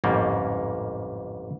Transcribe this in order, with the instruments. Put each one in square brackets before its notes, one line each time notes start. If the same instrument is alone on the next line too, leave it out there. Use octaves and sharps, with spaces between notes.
[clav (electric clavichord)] A1 F2 G#2 C#3 G3 A#3